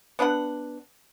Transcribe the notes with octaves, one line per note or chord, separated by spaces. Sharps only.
B3 D4 B4 F#5